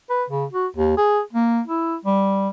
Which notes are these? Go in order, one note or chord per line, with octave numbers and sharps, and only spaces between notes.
B4
C#3
F#4
D#2
G#4
A#3
E4
G3